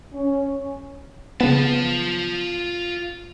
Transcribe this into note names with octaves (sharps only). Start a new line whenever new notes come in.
C#4
C#3 B3 F4 A5